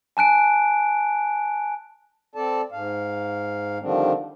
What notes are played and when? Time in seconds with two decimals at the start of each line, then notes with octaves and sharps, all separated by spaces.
0.17 G#5 A5 F#6 D7
2.35 C4 A4 D5 A5
2.72 G#2 F5
3.80 D3 D#3 F3 G3 C4 D4